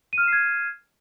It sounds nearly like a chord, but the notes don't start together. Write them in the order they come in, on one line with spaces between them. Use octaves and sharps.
D#7 F6 E7 C7 G#6